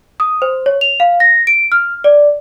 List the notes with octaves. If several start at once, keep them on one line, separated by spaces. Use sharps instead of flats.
D#6
C5
C#5
F7
F5
A#6
D7
F6
D5